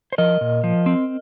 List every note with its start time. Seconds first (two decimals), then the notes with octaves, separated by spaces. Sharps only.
0.12 C5
0.18 F3 A#4 D#5
0.41 A#2
0.64 F3
0.86 C4